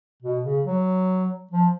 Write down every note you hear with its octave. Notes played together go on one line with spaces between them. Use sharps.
B2
C#3
F#3
F3